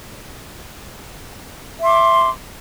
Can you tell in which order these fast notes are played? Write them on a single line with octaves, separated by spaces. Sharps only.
E5 C6 D6